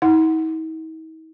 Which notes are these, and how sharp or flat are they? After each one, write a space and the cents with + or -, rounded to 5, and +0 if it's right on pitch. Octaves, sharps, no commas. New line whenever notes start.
D#4 +45 F#5 +0